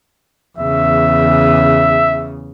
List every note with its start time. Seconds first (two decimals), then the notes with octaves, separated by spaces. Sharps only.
0.58 E2 C#3 E5